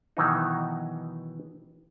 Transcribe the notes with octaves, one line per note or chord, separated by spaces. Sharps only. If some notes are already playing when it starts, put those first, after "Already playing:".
B2 D#3 E3 F#3 B3 D#4